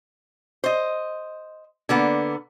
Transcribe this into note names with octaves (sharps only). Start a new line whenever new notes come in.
C5 D#5
D3 A#3 B3